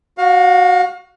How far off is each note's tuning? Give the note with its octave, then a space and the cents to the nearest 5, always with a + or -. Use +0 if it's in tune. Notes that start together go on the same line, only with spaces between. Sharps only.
F#4 +0 F5 +35